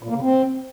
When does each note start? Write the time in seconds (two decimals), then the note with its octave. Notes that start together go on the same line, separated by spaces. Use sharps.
0.03 A#2
0.09 A#3
0.15 C#3
0.21 C4